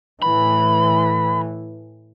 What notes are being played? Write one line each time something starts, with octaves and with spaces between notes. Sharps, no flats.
A2 E3 B5